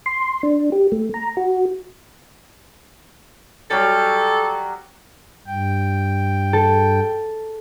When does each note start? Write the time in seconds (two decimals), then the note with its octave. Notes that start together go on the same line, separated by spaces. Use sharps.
0.06 C6
0.43 D4
0.72 G4
0.92 A3
1.14 A#5
1.37 F#4
3.71 F#3 G3 A4
5.47 G2 G5
6.53 A4